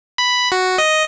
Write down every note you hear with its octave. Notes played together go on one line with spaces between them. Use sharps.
B5
F#4
D#5